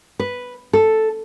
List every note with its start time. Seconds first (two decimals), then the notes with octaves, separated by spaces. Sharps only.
0.19 B4
0.73 A4